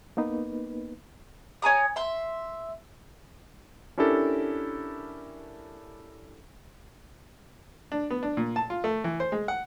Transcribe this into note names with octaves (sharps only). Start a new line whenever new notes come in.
A#3 B3 D#4 B4
C#5 G#5 A#5 D#6
E5 C6
C#4 D4 E4 G4 A4 A#4
D4
B3
D4
A#2
A5
F4
A3
E3
C5
G#3
F#5